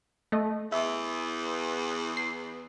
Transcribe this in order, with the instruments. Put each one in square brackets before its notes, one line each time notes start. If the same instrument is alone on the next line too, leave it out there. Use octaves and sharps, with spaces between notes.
[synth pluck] A3 D#5
[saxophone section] E2 [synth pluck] E5
[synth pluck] C7